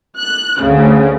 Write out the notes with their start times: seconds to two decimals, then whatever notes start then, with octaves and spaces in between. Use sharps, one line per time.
0.19 F#6
0.61 D2 C#3